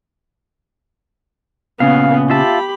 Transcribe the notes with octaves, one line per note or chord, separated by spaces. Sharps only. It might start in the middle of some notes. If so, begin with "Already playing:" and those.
A#2 C#3 B3 F5
F4 G4 E5 A5 B5